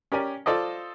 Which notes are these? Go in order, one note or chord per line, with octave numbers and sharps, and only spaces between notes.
C#4 G4 A#4 D5 G#5
F4 A4 C5 D5 D#5